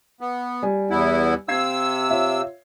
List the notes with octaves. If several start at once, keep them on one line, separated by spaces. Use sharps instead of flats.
B3
G3 G#5
E2 B3 E4
C3 F5 E6 G#6 C7
F4 C#5 E5